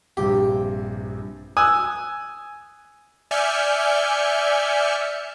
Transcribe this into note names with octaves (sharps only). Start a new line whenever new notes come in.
A#1 G2 C3 G4
G#5 D#6 E6 F#6
D5 E5 G#5 F6 G6 C#7